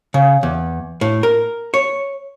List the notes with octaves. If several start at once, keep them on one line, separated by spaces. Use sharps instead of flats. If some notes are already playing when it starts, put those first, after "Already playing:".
C#3
E2
A2
A#4
C#5